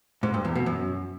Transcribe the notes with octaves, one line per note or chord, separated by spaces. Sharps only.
G#2
G2
E2
B2
F#2